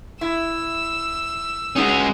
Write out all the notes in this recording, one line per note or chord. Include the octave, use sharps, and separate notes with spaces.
E4 E6
G#3 C#4 D#4 F#4